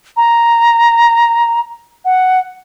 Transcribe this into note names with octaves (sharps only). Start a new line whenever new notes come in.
A#5
F#5